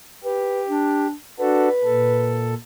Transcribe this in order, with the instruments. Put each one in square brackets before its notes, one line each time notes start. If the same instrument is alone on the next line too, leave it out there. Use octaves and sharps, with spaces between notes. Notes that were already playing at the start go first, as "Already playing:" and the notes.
[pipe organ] G4 [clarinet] B4
[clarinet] D4
[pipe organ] D4 F#4 A4 [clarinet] B4
[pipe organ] A#2 A4